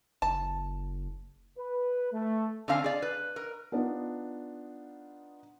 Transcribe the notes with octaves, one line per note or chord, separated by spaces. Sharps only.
F#1 A5
B4
A3
D3 A3 C4 F5 G#5
G#4 D5
B4
A#4
B3 D4 D#4 F4